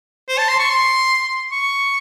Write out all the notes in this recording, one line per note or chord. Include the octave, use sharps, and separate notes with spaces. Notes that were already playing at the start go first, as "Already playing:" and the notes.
C5
A5
C6
C#6
C6
C#6